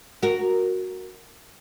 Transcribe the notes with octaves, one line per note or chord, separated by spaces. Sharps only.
F#4 A#4